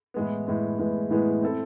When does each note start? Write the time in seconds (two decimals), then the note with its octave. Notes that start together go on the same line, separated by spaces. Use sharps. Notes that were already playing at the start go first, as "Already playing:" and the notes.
0.14 A2 E3 G#3 B3
0.47 A2 E3 G#3 B3
0.79 A2 E3 G#3 B3
1.11 A2 E3 G#3 B3
1.42 C4 E4 A4